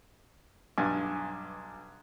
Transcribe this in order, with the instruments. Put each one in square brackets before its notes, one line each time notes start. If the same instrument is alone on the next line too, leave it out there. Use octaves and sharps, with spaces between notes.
[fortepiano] B1 G2 G#5